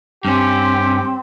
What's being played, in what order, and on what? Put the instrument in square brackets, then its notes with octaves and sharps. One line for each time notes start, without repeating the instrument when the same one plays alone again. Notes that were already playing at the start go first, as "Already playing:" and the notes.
[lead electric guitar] G2 C#4 [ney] C4 [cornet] G4